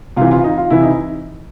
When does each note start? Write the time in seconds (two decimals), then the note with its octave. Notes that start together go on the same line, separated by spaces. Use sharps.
0.17 C3 E3 F4
0.31 F4
0.44 D#4
0.58 F4
0.70 C3 E3 E4
0.83 D#4